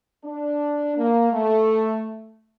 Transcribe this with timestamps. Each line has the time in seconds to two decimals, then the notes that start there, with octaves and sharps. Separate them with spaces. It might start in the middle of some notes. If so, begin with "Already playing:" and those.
0.24 D4
0.97 A#3
1.33 A3